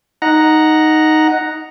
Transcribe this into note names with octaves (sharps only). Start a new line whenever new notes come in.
D#4 F#5 A#5